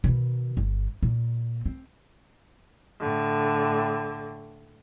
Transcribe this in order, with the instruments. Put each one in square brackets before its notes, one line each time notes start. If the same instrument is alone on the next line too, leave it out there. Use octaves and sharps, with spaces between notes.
[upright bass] B2 D#3
G1
A#2 A#3
C4
[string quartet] A2 D3